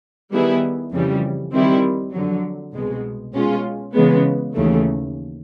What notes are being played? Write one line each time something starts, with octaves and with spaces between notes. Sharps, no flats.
D#3 G3 B3 E4 G#4
F2 C#3 E3 G3
D#3 G3 C4 E4
F2 D3 F#3
C2 B2 G#3
B2 G#3 C#4 F4
C#3 E3 G#3 B3
D#2 C#3 E3 A3